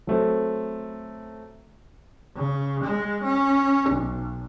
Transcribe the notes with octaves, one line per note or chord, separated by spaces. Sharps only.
F#3 A3 C4
C#3
G#3
C#4
B1